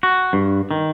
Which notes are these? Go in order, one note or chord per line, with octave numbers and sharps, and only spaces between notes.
F#4
G2
D#3